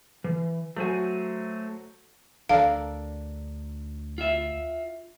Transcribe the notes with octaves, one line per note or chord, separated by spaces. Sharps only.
E3
F#3 A3 F#4 C5 G#5
D2 D4 A4 A#4 F5
F4 E5